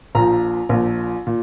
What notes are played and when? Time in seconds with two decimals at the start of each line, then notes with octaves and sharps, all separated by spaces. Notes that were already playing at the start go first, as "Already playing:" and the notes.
0.15 A#1 A#2 F3 A#5
0.69 A#1 A#2 F3
1.27 A#2